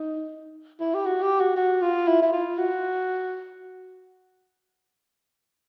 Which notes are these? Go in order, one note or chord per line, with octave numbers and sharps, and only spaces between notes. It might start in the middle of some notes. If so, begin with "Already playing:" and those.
Already playing: D#4
E4
G4
F#4
G4
F#4
F#4
F4
E4
E4
F4
F#4